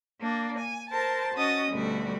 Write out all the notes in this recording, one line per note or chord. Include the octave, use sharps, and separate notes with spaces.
A#3 D4
G#5
A#4 C5 A5
C#4 F#4 D#5 D#6 A6
D2 B2 G3 A3 F#4